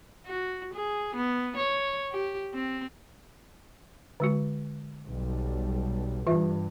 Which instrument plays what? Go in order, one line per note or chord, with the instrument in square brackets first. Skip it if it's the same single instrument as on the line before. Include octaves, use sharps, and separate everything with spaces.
[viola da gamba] F#4
G#4
B3
C#5
G4
C4
[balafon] D3 G#3 F#4
[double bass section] B1 G3
[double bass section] G2 [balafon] E3 F4 E5